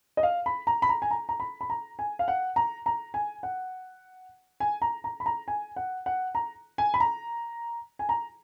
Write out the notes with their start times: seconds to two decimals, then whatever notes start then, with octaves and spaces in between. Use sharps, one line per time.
0.17 D#5
0.23 F5
0.46 B5
0.67 A#5
0.82 B5
0.89 A#5
1.02 G#5
1.11 A#5
1.29 A#5
1.40 B5
1.61 B5
1.70 A#5
1.99 G#5
2.19 F5
2.28 F#5
2.56 A#5
2.86 A#5
3.14 G#5
3.43 F#5
4.60 G#5
4.82 A#5
5.04 A#5
5.20 B5
5.26 A#5
5.48 G#5
5.76 F#5
6.06 F#5
6.35 A#5
6.78 G#5
6.94 B5
7.00 A#5
7.99 G#5
8.09 A#5